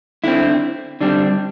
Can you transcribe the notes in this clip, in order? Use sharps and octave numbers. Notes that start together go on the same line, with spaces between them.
D3 C4 E4
D3 G3 C4 D4